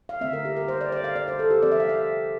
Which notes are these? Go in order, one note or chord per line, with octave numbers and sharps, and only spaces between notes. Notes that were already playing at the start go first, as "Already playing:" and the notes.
F5
D3 A3 C4 E5
A#4
G4
A#4
C5
D5
D5
F5
D5
C5
A4
G4
F3 C4 D5
E5
F5
E5